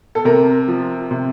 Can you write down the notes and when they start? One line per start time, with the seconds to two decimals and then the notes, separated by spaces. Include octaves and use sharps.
0.15 A4
0.25 C3 A#4
0.68 F3
1.11 C3